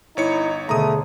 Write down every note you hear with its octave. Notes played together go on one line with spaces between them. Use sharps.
G1 D#4 E4 C#5 C#7
D#2 B2 D3 A3 G#4 A#5 D#6